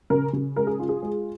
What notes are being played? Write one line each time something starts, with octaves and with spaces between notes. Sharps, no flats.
C#3 A#4
C#3
G#3 A#4
G#4
F4
G#4
G#3